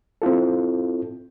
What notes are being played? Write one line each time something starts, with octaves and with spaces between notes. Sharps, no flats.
C4 E4 F4 A4